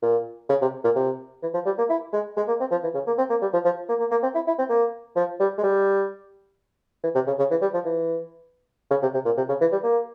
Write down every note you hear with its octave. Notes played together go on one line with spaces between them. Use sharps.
A#2
C#3
C3
A#2
C3
E3
F3
G3
A#3
E4
G#3
G#3
A#3
C4
F3
E3
C#3
A#3
C4
A#3
G3
F3
F3
A#3
A#3
A#3
C4
E4
E4
C4
A#3
F3
G3
G#3
G3
E3
C3
C#3
C#3
E3
G3
F3
E3
C#3
C3
C3
A#2
C3
C#3
E3
G3
A#3